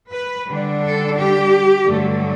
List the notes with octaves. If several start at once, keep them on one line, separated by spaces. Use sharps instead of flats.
B4
D3 G3 D4
A4
G4
G2 D3 F#3 A3